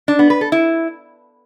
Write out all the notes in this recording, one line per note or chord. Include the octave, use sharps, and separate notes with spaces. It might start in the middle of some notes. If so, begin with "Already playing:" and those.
D4
B3
B4
A4
E4